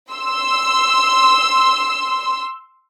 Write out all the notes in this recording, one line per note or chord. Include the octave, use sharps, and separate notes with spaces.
C6 E6